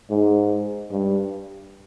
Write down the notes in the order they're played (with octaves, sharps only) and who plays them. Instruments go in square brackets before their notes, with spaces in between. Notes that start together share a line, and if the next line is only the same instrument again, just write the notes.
[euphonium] G#2
G2